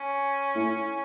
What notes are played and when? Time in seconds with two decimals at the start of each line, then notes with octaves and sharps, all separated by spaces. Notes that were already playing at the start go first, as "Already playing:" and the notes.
Already playing: C#4
0.55 A2